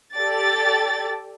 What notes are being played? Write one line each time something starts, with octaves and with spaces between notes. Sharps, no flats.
G4 A4 D5 A6